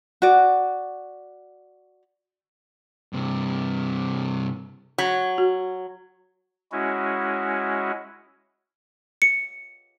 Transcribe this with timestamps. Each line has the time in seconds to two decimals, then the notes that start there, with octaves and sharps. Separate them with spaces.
0.22 F#4 D5
3.13 G2 C3
4.98 F#3
5.38 F#4
6.72 G#3 C#4 E4 F#4
9.22 C#7